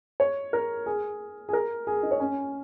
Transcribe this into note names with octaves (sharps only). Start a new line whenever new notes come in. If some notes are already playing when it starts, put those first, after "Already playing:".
C#5
A#4
G#4
G#4
A#4
G#4
D#4
C#5
C#4